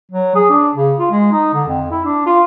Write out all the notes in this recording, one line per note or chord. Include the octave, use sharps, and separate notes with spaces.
F#3
G#4
D4
C#3
F4
G#3
D#4
D3
F2
E4
D4
F4